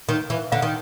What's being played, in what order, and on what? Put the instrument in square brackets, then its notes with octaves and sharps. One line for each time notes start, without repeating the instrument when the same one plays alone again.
[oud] D#3
E3
[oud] D3 [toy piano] F5
[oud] D#3